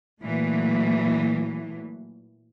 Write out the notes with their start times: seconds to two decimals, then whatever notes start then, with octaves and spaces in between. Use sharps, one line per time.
0.22 A#2 E3 F#3 A3